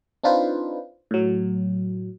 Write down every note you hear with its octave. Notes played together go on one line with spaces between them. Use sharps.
C4 D4 D#4 F4 B4 C5
A2 F#3